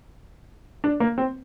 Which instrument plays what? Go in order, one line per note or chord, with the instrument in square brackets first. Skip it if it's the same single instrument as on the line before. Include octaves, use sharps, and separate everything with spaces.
[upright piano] D4
A#3
C4